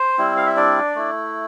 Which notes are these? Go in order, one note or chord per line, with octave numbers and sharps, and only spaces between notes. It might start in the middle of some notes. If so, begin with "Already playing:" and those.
Already playing: C5
G3 C4 E4
F5
E5
D4 D5
A3 E4